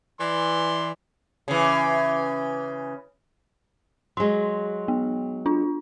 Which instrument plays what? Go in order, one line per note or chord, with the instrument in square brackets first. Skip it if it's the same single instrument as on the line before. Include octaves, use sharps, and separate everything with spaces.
[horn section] E3 D5 C6
[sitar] C#3 E3
[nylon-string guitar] F#3 G#3 [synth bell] C6
[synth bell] B3
D4 F4